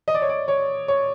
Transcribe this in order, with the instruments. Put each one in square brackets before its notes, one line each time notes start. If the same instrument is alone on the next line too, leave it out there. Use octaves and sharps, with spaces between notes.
[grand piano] D#5
D5
C#5
D5
C#5
C#5